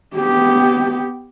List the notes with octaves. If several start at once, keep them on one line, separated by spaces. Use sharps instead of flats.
B3 G4